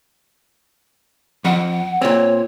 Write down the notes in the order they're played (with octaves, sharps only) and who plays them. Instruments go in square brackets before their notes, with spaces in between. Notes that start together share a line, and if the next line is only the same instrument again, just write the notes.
[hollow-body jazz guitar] F2 [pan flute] F#5
[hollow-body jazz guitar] A#2 C4 [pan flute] C#5